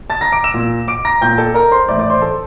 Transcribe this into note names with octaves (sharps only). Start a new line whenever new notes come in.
A5 A6
A#5 A#6
D6 D7
E6 E7
A#2
D6 D7
A#5 A#6
A#2 G5 G6
A4 A5
A#4 A#5
C5 C6
A2 E3 D5 D6
D5 D6
C5 C6
A4 A5